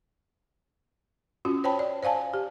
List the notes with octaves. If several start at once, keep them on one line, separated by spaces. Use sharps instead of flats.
C#4 F4 F#4
C5 C#5 G5 A5 B5
D5
C5 D5 F5 G#5 A5
G4